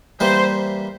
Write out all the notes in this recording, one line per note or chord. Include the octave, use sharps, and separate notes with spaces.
E3 G3 A#3 C5